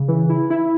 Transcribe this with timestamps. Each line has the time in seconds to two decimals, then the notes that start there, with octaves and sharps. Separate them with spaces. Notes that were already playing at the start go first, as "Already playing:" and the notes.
Already playing: C#3
0.08 E3
0.29 E4
0.50 E4